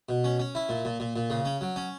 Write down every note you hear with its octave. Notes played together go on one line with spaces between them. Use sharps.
B2
C#4
C#4
E4
A#2
A#2
A#2
A#2
C#3
C#4
F#3
C#4